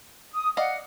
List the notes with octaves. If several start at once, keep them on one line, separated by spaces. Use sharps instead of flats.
D#6
D5 D#5 F5 F#5